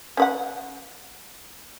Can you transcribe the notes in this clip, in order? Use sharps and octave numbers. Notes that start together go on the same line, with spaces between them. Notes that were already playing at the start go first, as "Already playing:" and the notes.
C#4 B4 F#5